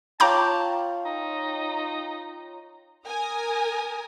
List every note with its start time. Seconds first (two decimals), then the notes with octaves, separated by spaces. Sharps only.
0.20 F4 C#5 G5 A5 A#5 D6 G6
1.05 D#4
3.07 A#4 G#5 A#5 D#6